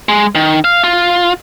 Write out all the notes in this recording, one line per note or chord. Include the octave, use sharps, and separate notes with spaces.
G#3
D#3
F5
F4